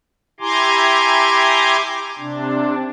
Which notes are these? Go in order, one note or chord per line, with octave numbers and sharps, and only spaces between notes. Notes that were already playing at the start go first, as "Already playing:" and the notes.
E4 G4 G#5 A#5 C6 D6
C3 D4